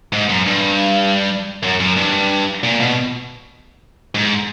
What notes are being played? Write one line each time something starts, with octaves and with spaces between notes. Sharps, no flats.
G#2
F#2
G2
F#2
F#2
G2
A#2
B2
G#2